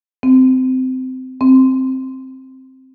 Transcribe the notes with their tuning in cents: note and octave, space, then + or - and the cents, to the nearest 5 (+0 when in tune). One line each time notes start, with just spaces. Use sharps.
C4 -20
C4 +5